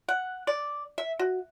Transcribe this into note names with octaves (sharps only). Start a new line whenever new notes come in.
F#5
D5
E5
F#4